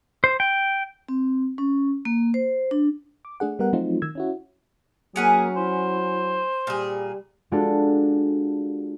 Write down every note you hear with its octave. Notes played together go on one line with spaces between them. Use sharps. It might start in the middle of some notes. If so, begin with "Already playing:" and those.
C5
G5
C4
C#4
A#3
C5
D4
D6
A3 D4 G#4 F#5
G3 B3 A#4 F#5
F3 F#3 A3 C4 D#4 F4
D#3 E6 G#6
C#4 E4 F#4
F#3 A#3 C#4 G#4 F#5 G#5
E4 C5
A#2 G3 G#4
G#3 D4 F4 F#4 A4